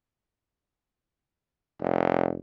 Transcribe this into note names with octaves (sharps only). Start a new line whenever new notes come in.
F1